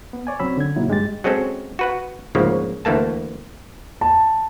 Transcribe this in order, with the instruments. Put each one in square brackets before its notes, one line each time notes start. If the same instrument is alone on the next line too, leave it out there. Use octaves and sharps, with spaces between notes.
[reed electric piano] B3
C#5 D5 G#5
C2 F#3 C4 C#4 B5 E6
D3 G#6
A#2 C#3 F#3 A#3 D#4 E4
G2 G#3 G4 A6
[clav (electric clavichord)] F#3 G#3 C4 C#4 A4
F#4 B4 F#5
D2 G#2 C#3 F3 A#3
D2 E3 A3 A#3 A5
[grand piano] A5